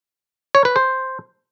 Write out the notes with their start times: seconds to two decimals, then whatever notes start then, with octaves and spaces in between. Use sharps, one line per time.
0.55 C#5
0.65 B4
0.76 C5